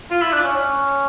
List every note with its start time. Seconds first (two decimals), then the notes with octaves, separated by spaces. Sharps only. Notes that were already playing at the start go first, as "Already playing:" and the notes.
0.11 F4
0.22 E4
0.33 D4
0.44 C#4
0.56 C#4